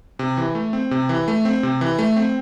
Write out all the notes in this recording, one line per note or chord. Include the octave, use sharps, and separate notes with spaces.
C3
E3
A3
C4
C3
E3
A3
C4
C3
E3
A3
C4